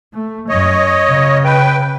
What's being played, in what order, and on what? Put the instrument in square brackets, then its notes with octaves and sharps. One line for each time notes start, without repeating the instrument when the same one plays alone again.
[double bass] A3
[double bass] F#2 [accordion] C#5 D#5
[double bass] C#3
[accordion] B4 G5